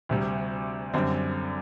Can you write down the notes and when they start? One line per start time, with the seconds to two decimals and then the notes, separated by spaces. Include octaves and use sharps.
0.09 D2 C3 G3
0.94 F#2 D3 G3 C4